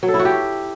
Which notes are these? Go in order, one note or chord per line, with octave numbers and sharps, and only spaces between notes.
F#3
A4
E4
F#4
G4